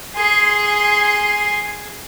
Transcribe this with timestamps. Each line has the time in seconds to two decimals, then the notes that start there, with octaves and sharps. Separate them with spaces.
0.16 G#4 C6